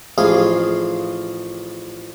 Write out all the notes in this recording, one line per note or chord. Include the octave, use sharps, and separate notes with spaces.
A1 F3 G#4 F5 C6